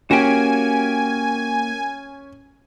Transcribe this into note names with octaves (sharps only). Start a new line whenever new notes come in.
A#3 C#4 F#4 G4 G#5